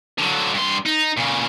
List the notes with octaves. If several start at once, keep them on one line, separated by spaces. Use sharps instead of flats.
D3 F#3
G2 C6
D#4
A#2 C#3